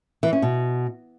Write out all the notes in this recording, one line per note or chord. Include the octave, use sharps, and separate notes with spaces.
E3
C#4
B2